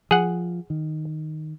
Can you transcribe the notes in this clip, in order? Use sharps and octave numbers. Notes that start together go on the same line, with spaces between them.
F3 G#4 F#5
D#3